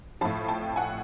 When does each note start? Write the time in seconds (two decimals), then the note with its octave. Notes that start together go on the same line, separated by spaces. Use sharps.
0.21 A2 F3 A5 B5
0.48 G5 A5
0.76 F#5 G#5